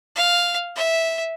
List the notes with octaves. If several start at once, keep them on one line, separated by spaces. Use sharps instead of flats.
F5
E5